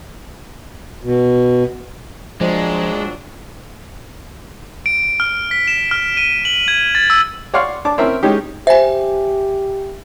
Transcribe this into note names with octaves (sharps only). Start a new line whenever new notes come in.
B2
A#2 F3 F#3 G#3 D4 C5 D#5
D7
F6
B6
E7
F6
D#7
F#7
G#6
A6
E6
C#5 D5 F5 F#5 C6 C#6
D4 A5 D6
C4 C#4 A#4 E5 A#5
G#3 C#4 D#4 G4
G4 C5 E5 G#5